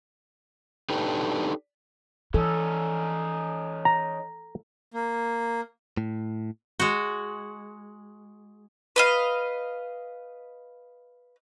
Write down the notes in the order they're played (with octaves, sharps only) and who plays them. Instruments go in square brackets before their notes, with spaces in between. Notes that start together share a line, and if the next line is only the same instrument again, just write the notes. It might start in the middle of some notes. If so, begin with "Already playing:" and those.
[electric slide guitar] D4 D#4 G4 A4 B4
[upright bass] E3 [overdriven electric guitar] C#4 D#4 [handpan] A4
[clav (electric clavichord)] A#5
[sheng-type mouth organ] A#3
[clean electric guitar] A2
[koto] G#3 F#4
[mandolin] B4 D#5 F5